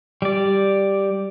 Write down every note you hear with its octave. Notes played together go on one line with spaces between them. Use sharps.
G3 D5